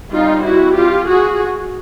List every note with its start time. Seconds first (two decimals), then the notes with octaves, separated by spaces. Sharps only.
0.12 G3 C4 D#4 F4
0.44 E4 F#4
0.76 F4 G4
1.07 F#4 G#4